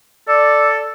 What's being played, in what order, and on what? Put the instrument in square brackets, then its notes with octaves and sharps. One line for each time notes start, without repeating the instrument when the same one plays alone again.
[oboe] A4 [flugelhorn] D5